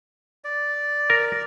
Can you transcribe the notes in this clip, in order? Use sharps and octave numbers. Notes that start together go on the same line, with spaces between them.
D5
A#4